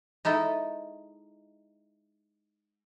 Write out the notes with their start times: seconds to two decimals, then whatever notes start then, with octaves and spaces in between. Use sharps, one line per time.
0.25 G#3 D#4 E4 A4